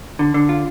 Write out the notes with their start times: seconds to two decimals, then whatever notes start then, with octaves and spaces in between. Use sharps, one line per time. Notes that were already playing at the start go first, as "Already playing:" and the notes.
0.19 D3
0.34 D3
0.49 F4